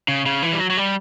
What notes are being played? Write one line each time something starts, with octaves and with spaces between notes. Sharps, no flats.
C#3
C#3
E3
G3
F#3
F#3
G3